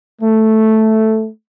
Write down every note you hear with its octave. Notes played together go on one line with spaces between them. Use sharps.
A3